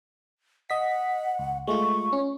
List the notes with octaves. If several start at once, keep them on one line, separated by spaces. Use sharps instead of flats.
D#5 F#5 B6
C#2
G#3 A3 F4 C#6
C#4